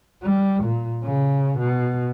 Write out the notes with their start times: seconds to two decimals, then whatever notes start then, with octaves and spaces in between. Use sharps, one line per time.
0.23 G3
0.64 A#2
1.04 C#3
1.59 B2